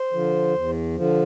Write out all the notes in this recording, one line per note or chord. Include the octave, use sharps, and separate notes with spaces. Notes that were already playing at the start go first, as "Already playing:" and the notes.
Already playing: C5
D3 F3
E2
D3 F3